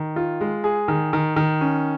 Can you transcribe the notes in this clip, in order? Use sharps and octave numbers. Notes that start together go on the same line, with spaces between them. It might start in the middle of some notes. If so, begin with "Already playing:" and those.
Already playing: D#3
F4
G#3
G#4
D#3
D#3
D#3
C#4